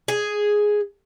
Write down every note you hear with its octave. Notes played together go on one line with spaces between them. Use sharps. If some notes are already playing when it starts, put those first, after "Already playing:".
G#4